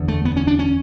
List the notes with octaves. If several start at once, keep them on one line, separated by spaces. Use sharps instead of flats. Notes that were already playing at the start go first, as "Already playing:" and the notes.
Already playing: F#1 E2 D3
A3
B3
C#4
D4
C#4